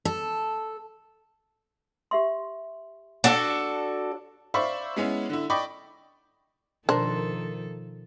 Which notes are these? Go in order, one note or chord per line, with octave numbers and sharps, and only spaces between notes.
A4
G4 E5 C6
D4 F#4 A4 G5
C5 D5 E5 F5 B5 C#6
G#3 B3 C#4 E4
D3 E4
D5 D#5 G5 B5 C#6 D6
B2 D#3 F3 D4 A4 A#4 C5